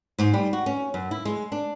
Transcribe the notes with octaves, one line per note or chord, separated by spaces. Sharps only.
G#2
G3
F#4
C#4
F#2
E4
G#3
D4